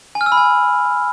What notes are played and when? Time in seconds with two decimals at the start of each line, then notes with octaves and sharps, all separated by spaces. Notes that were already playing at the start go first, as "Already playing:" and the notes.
0.15 G#5
0.21 F6
0.26 E6
0.32 B5
0.37 G#5